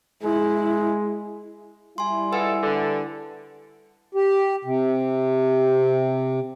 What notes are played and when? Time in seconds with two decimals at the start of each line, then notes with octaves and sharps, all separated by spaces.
0.23 G#3 E4
1.98 G3 E4 G#5 C6
2.33 G#3 F4 A4 B4 F#5 G#5
2.63 D3
4.15 G4
4.65 C3